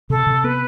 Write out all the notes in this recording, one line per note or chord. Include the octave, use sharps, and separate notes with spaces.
C3 A4
C3
B3 B4